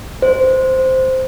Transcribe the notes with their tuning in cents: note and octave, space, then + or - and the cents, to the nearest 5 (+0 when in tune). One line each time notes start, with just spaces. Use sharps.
C5 -5